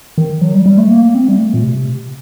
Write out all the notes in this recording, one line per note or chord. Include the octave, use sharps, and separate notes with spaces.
D#3
F#3
G3
G3
A3
A#3
C4
G3
A3
A#2
C3